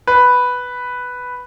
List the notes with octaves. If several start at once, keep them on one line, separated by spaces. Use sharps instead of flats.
B4